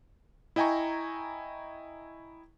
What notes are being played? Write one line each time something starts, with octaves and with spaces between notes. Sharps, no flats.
E4 D#5 G5 G#5 A#5 C#6